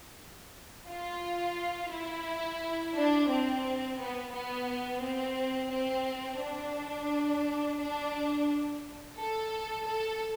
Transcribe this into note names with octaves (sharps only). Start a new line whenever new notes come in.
F4
E4
D4
C4
B3
B3
C4
C4
D4
D4
A4
A4